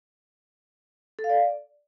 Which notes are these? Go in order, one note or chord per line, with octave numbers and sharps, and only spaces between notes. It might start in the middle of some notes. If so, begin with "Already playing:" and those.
A4
F5
D5